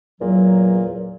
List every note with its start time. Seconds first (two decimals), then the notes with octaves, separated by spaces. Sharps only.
0.20 E2 A#2 F#3